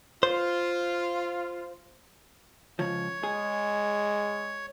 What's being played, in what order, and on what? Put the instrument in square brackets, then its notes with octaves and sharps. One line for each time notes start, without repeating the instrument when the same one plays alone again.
[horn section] F4 [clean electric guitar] C5
[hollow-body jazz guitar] C#2 F3 [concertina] C#5
[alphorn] G#3 [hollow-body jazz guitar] G#4